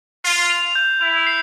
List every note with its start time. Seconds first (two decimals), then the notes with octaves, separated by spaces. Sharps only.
0.25 F4 C7
0.50 F7
0.75 G6
1.01 E4 F7
1.27 C7